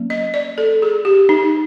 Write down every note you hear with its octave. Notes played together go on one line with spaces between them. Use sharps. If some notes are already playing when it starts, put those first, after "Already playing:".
Already playing: F#3 A#3 C#4
D#5
D5
A4
G#4
G4
D#4